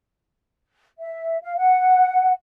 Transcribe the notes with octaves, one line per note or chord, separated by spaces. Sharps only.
E5
F5
F#5